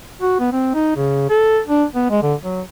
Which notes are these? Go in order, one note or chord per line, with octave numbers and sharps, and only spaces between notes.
F#4
B3
C4
D#4
C#3
A4
D4
B3
G#3
D3
F#3